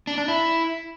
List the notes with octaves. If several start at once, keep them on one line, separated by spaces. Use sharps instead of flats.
D4
D4
E4